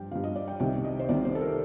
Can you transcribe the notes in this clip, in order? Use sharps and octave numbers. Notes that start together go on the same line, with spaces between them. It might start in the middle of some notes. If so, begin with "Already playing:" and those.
Already playing: G2 F3 G5
G2 F3 F5
D#5
D5
G5
C2 C3 D#3 G5
D#5
C5
C2 C3 D#3 D5
C5
A4
A#4